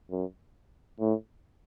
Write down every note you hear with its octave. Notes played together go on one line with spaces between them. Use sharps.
F#2
A2